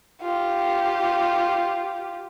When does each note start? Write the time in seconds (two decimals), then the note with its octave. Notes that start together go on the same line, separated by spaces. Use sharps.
0.22 F4 G4